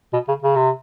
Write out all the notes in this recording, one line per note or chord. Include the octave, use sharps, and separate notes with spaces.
B2
C#3
C#3
C3